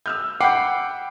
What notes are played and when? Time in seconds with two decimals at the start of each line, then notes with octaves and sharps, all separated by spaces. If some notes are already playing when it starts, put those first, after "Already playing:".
0.06 E6 F6 G6
0.41 F#5 G5 B5 D6 G6 C7